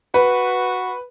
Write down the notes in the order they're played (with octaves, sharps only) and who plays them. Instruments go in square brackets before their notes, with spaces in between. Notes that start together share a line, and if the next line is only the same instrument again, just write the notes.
[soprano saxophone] F#4 [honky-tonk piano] B4